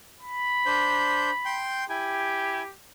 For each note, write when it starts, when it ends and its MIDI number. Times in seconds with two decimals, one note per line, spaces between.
0.21 1.61 83
0.66 1.30 62
0.66 1.30 72
0.66 1.30 91
1.45 1.85 79
1.45 1.85 84
1.45 1.85 91
1.89 2.62 64
1.89 2.74 67
1.89 2.62 79
1.89 2.62 80